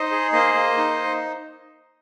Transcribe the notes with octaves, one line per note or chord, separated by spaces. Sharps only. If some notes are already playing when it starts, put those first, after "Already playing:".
Already playing: D#4 C5 D#5
G#4
A#3 C5 D#5
A#3
D#4